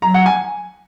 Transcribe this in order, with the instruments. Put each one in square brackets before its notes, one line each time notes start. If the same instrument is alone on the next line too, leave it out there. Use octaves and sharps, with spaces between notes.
[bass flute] F#3 [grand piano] A#5
[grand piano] F#5
G#5